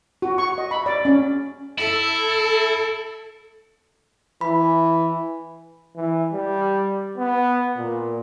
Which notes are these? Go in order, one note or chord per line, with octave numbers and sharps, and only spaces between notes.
F#4
C#6
D#5
B5
D5
C#4
E4 A4
E3 B5
E3
G3
B3
A#2